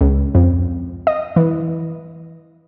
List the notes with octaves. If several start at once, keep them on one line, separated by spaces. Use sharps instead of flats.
C#2
F2
D#5
E3